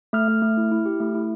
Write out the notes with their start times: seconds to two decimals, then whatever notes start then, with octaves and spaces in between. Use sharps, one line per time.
0.13 A3 F6
0.28 A3
0.42 A3
0.57 E4
0.71 E4
0.86 G4
1.00 A3
1.15 E4